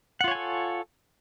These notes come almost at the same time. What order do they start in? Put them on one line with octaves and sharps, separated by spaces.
F#5 F4 C#5 G#5 A4